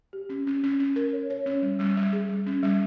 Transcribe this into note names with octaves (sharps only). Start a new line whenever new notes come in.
G4
C#4
C#4
C#4
C#4
A#4
C#5
C#5
C#4
G3
G3
G3
G#4
G3
C#4
G3